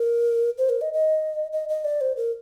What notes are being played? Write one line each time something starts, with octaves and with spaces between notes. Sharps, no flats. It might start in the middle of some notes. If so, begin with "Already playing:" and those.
Already playing: A#4
C5
A#4
D#5
D#5
D#5
D#5
D5
C5
A#4